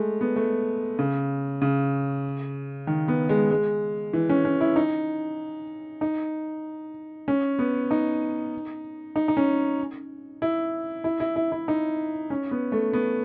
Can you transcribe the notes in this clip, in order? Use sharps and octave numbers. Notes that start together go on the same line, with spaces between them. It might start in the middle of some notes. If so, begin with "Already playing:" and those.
Already playing: G#3 A3
B3
A3
C#3
C#3
D#3
B3
G#3
G#3
E3
C#4
C#4
E4
D#4
D#4
C#4
B3
D#4
D#4
D#4
C#4
E4
E4
E4
E4
E4
D#4
C#4
B3
A3
B3